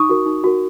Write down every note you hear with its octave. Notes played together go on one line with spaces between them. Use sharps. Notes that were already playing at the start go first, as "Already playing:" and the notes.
Already playing: D#4 C#6 D#6
F#4 A#4
D#4
F#4 A#4